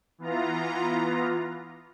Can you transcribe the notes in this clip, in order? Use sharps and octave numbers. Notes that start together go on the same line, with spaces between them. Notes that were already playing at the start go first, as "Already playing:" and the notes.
E3 B3 F4 A#5